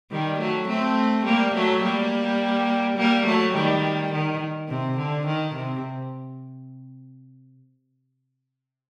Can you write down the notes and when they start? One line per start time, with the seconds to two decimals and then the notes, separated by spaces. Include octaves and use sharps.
0.11 D#3 G3
0.39 F#3 A3
0.68 A3 C4
1.25 G3 A#3
1.54 F#3 A3
1.83 G3 A#3
2.97 G3 A#3
3.26 F#3 A3
3.54 D#3 G3
4.12 D#3
4.69 C3
4.97 D3
5.26 D#3
5.55 C3